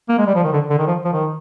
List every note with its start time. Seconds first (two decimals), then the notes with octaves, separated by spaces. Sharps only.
0.09 A#3
0.18 G#3
0.27 G3
0.35 F3
0.44 D#3
0.53 D3
0.70 D3
0.78 D#3
0.87 F3
1.04 F3
1.13 D#3